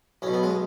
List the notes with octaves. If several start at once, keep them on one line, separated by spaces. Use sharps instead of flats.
B1 B2 C#4
B3
G#3